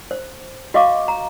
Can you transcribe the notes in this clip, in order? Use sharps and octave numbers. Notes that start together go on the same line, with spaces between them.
C5
F#4 D#5 F5 C#6 D6
A#5